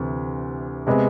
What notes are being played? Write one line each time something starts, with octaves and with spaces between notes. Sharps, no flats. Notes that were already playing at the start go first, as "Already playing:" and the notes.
Already playing: D2 C3 E3
C3 G#3 B3